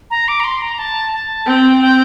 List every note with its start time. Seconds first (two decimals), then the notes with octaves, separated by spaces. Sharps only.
0.10 A#5
0.28 D6
0.40 A#5
0.44 C6
0.62 A#5
0.79 A5
1.13 A5
1.46 C4 G5
1.81 G5